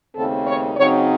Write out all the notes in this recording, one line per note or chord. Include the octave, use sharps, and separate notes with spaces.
D#2 C#3 A3 C4 D#4 A4
C#5
C#3 F#3 C4 D#4 C#5